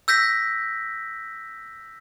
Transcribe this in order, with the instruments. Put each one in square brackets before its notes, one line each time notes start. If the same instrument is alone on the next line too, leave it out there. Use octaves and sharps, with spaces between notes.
[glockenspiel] E6 G6 A#6 B6